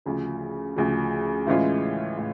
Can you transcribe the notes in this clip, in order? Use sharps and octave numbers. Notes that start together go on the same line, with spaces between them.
D2 C#3 F3
D2 C#3 F3
A2 E3 G#3 C#4 F4
A2